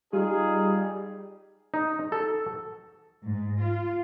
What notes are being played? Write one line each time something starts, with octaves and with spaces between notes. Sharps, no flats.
G3 D#4 F4 G4 G#4
D#4
A4
G#2
F4